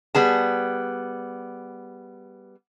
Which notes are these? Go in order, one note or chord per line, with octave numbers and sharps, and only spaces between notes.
G3 B3 G#4 A5